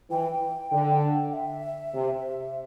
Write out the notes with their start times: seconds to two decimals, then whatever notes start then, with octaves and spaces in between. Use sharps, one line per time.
0.11 E3 G5
0.72 D3
1.33 E5
1.94 C3